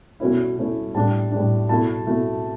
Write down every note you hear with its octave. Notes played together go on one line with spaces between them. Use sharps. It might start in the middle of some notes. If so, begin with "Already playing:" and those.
B2 A3 C#4 E4
B2 A3 C#4 E4
A2 G3 D4 A5
A2 G3 D4
B2 A3 E4 A5
B2 A3 E4